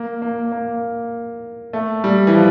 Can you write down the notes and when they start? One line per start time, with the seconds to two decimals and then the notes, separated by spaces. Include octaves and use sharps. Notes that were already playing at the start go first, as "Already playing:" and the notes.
Already playing: A#3
0.22 A#3
0.52 A#3
1.73 A3
2.04 G3
2.27 E3
2.34 F3